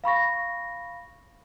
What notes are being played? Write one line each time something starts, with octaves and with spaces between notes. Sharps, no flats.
F5 B5 C#6 A#6